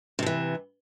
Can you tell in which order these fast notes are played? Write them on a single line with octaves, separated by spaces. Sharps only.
C3 F3 E3